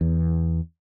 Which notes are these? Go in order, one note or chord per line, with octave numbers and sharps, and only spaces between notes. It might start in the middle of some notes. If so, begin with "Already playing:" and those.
E2